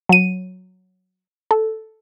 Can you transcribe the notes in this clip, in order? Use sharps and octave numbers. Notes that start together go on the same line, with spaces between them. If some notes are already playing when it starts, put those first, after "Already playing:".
F#3 D#7
A4